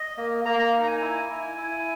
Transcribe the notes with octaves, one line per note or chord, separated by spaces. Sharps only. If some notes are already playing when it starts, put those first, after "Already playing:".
Already playing: D#5
A#3
A#3 A#5
A#5
D#4
A#5
G#5
E4 G#5
E4
E4